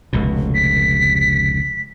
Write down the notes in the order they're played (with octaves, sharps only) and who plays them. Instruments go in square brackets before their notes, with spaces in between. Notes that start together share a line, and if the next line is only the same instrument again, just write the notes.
[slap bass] F1 C#2 B2
[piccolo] B6